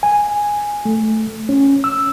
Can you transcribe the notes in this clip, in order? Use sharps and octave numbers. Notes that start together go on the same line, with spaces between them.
G#5
A3
C#4
E6